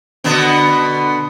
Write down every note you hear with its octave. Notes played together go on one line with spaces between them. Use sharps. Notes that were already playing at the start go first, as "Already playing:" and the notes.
B2 D3 B3